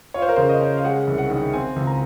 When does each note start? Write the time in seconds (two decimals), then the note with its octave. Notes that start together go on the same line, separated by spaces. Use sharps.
0.14 F4 C#5
0.22 C5
0.29 A#4
0.36 C#3 C5
0.49 D#5
0.61 C#4
0.77 F5
0.84 G#3 F#5
1.07 C2
1.18 F#5
1.30 D#3
1.53 C4 G#5
1.76 C#2
1.87 A#5